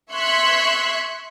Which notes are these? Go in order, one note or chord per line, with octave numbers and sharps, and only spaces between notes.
E5 C6 C#6 F#6 G#6 B6